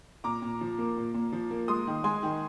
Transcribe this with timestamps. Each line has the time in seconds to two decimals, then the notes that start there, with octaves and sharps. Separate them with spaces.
0.24 A#2 A#5 D6
0.42 A#2
0.61 F3
0.78 A#3
0.97 A#2
1.14 A#2
1.33 F3
1.51 A#3
1.68 G#3 C6 D#6
1.87 D#3
2.04 G#3 G#5 C6
2.23 D#3